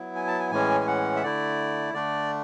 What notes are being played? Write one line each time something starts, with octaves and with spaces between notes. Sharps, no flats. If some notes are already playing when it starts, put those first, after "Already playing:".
Already playing: F#3 B3 E4
G#5
A5
G#5
A2 E3 G#3 C#4 G#5
G#5
F#5
E5
D3 A3 E4 D5
D3 A3 D4 D5